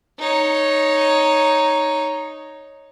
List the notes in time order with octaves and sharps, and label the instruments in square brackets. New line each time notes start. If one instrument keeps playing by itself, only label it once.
[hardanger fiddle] D#4 C#5